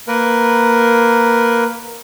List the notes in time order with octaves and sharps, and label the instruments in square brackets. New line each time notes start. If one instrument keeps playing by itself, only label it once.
[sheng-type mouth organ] A#3 A#4 B4